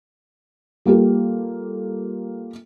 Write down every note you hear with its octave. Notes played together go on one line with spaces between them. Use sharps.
G3 A#3 F4 G4 A4